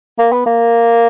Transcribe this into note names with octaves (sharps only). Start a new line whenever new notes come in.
A#3
B3
A#3